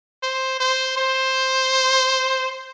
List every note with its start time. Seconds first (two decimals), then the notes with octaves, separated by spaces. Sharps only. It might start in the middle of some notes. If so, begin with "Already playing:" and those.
0.23 C5
0.60 C5
0.97 C5